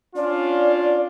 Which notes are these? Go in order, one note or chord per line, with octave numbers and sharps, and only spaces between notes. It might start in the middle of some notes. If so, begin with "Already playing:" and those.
C#4 D4 F4 D5